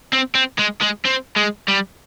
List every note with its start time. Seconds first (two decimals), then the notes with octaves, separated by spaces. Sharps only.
0.13 C4
0.35 C4
0.59 G#3
0.82 G#3
1.05 C4
1.37 G#3
1.68 G3